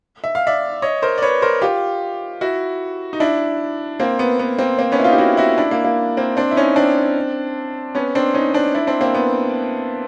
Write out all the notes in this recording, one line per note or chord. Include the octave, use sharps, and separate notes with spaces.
E5
F5
D5 E5
C#5 D#5
A#4 C5
D5
B4 C#5
A#4 C5
F4 G4
E4 F#4
D#4
D4 E4
A#3 C4
B3
B3
A#3 C4
A#3 C4
B3 C#4
E4
D#4 F4
G4
E4 F#4
E4 F#4
D4 E4
A#3
A#3
A#3 C4
C4 D4
E4
C#4 D#4
C4 D4
B3 C#4
C4 D4
C#4 D#4
C4 D4
D4 E4
C4 D4
A#3 C4
B3